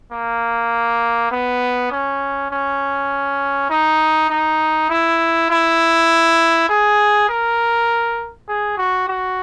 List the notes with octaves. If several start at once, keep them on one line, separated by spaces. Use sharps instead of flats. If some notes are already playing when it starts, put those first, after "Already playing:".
A#3
B3
C#4
C#4
D#4
D#4
E4
E4
G#4
A#4
G#4
F#4
F#4